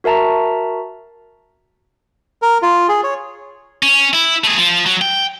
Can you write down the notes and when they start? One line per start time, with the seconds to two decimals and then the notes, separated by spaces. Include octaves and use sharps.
0.04 F#4 A#4 E5 A5 A#5
2.42 A#4
2.62 F4
2.89 G#4
3.04 C#5
3.83 C#4
4.13 E4
4.44 A3 G#4
4.57 F3
4.86 F#3
5.02 G5